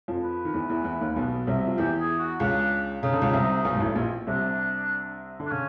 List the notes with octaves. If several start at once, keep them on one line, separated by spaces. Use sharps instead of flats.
F2 F3
B4
D#3
E2 E3
E2 E3
E2 E3
D#2 D#3
B1 B2
C2 C3
F3
E2 E3 G4
G#4
F#4
C#2 C#3 D4
C#3 D#4
D3
C#2 C#3
C2 C3
B1 B2
G#2
A1 A2
A#1 A#2
C2 C3 D4
D3
D4
C#3 C#4